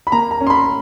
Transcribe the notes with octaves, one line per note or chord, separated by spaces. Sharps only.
B5
A#3 A#5
A#5
C#4
C6
B5